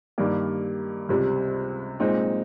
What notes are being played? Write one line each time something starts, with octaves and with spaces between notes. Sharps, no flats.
G2 D#3 G3 A#3
C#2 C3 G3
A#2 G#3 C4 D#4